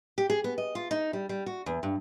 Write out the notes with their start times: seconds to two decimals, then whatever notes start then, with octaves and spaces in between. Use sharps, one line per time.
0.18 G4
0.30 G#4
0.44 B3
0.58 D#5
0.75 F4
0.91 D#4
1.13 G3
1.29 G3
1.46 F#4
1.66 E2
1.83 G2